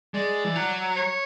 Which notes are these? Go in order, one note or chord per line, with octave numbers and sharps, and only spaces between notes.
G#3 D5
E3
F#3
C#5